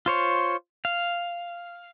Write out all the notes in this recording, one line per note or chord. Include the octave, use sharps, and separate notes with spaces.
F4 C5 C#5
F5